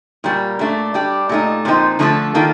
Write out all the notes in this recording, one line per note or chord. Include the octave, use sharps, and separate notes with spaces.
A#2 G3 A#3
A#2 A3 D4
G3 D4 G4
A#2 A3 D#4
A#2 F3 C4 D#4
D3 F3 A3 D4 A4
D#3 A#3 F4 A4